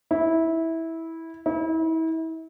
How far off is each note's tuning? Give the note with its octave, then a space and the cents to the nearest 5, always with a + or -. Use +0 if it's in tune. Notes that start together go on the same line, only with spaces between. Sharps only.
E4 -15
E4 -35